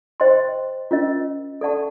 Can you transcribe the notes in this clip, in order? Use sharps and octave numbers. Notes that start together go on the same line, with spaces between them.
C5 D#5 G5 C6
C#4 F4 A#4 D#5
A4 D5 F#5 A5 C#6